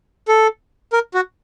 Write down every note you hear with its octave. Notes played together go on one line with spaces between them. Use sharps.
A4
A#4
F#4